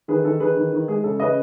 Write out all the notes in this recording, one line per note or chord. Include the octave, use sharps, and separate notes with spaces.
D#3 G#4 B4
D#3 A4
D#3 G#4 B4
D#3
D#3
G#3 G#4
C#3 A4
C#3 B4 D#5